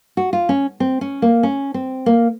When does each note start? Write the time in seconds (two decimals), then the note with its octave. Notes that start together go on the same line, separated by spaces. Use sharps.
0.17 F#4
0.33 F4
0.49 C#4
0.80 C4
1.01 C#4
1.22 A#3
1.43 C#4
1.74 C4
2.06 A#3